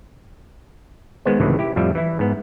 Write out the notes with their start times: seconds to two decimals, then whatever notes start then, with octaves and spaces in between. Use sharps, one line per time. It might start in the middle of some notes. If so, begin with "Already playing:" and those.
1.25 D#3 G#3 B3 C5
1.40 C#2 A2 C3 D#3 E3
1.59 E4 G4
1.76 F2 A2 F3 G3 E5
1.95 E3 E4
2.19 G#2 B3